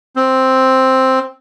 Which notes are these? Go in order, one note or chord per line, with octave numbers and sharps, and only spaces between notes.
C4